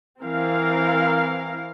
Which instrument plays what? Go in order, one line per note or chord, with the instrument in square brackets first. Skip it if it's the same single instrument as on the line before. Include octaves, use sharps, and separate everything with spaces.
[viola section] E3 C4 A#4 F5